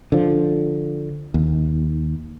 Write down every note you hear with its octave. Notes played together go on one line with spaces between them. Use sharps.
D3 F3
D#2